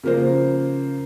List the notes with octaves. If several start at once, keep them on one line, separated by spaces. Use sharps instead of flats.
C#3 F3 A#3 A#4 C5